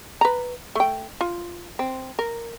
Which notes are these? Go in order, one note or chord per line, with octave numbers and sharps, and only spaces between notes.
B4 A#5
A3 G5
F4
C4
A#4